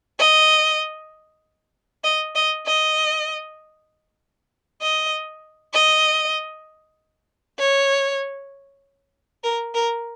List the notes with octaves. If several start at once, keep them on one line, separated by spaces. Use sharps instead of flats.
D#5
D#5
D#5
D#5
D#5
D#5
C#5
A#4
A#4